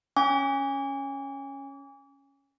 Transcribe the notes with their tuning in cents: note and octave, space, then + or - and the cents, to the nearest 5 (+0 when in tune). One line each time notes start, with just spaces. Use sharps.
C#4 +0 G#5 -25 D6 -40